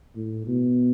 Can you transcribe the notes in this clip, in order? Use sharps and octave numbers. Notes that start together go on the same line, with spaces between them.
A2
B2